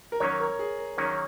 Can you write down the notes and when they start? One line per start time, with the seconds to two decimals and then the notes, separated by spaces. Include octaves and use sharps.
0.12 A#4
0.20 D#3 F#3 A#3 C#4 C#5
0.40 A#4
0.59 G#4
0.79 A#4
0.98 D#3 F#3 A#3 C#4 C#5